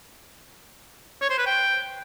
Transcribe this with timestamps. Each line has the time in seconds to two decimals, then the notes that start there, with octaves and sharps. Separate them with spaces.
1.21 C#5
1.30 C5
1.38 B4
1.46 G5